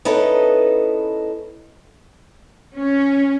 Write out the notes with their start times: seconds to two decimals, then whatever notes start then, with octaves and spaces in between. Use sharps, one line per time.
0.05 B3 C#4 D#4 E4 A4 B4
2.75 C#4